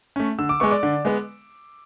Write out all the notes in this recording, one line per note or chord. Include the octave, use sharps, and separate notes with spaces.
A3 C#4
D3 E6
D6
G#3 B3 C#6
D5 D6
D3
G#3 B3